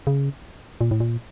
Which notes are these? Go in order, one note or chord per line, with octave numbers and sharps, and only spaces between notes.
C#3
A#2
A2
A#2